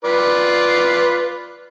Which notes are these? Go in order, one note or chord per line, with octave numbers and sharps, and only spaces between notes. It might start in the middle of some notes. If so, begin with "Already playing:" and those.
F4 B4 D5